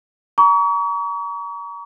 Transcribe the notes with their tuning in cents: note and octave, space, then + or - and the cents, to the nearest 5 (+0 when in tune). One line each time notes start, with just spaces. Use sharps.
A#5 +15 C#6 +40